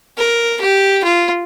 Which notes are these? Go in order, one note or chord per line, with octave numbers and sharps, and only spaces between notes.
A#4
G4
F4